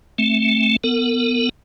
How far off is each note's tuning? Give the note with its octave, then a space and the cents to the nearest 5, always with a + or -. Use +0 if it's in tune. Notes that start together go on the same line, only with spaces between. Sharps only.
A3 +0 C4 +30
B3 +0 A#4 -40